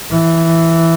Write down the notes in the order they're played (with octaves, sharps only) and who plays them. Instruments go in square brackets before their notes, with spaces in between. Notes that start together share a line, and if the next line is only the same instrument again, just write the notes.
[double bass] E3